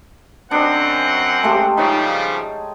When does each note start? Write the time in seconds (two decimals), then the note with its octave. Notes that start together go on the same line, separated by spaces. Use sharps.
0.51 F#2 C4 D4 D#5 F#5
1.43 G#3 A3 G4
1.77 C#3 F3 G3 D#4 C#5